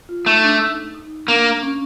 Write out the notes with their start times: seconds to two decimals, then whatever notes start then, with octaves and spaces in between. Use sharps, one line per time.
0.09 F4
0.26 A3 D#4
0.44 D4
0.60 D#4
0.95 D#4
1.28 A#3 D4
1.63 C#4